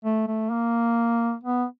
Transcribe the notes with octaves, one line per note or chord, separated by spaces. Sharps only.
A3
A3
A#3
B3